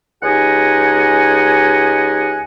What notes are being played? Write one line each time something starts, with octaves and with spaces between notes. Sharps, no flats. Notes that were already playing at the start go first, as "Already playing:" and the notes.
C#2 D#4 G4 D#5 F#5 G#5